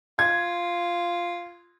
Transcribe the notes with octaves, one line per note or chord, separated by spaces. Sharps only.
F4 G#6